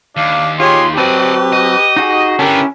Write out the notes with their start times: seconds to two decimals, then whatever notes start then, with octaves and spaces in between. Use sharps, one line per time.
0.17 D#2 D4 F5
0.60 F4 G4 G#4 C#5 C6
0.97 F#3 C4 G4 B4 D5 D#5 A5
1.52 D#5
1.96 D#4 F#4 G#4
2.39 D3 B3 C#4 E4 G4 A#4